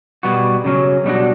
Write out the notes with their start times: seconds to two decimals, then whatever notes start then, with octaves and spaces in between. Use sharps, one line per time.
0.23 B2 G3 B3 F#4
0.64 C#3 F#3 C#4
1.04 B2 G3 D4 F#4